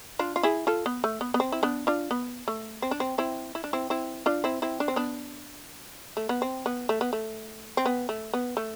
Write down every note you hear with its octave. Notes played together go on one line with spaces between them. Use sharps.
D4 F4
F4
E4 G#4
F4 A4
B3
A3
B3
B3
C4
E4
B3 D4
D4 F4
B3
A3
C4
D4
C4
C4 E4
E4
D4
C4 E4
C4 E4
D4 F4
C4 E4
C4 E4
D4
C4
B3 D4
A3
B3
C4
B3
A3
B3
A3
C4
B3
A3
B3
A3